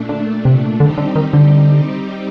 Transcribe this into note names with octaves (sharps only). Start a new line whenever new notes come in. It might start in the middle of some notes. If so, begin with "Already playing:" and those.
Already playing: A#2 A3 D4
D3
C3
D3 G3 C4 D#4 G4
D3
D#3
D3